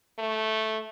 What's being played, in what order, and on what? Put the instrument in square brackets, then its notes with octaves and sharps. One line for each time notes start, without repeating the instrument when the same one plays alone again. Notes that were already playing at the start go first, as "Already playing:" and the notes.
[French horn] A3